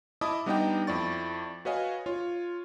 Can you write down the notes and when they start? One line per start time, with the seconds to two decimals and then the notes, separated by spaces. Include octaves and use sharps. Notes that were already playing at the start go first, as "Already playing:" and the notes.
0.21 E4 D#5 E5 A5 D6 D#6
0.46 G3 B3 D4 D#4 D#5 G5
0.87 F2 E4 D5 C#6 A6
1.65 F#4 B4 C#5 D#5 F5 G#5
2.06 F4 C#5